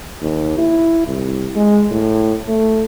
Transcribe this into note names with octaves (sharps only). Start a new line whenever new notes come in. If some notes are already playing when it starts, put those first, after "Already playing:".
D#2
E4
C2
G#3
A2
A3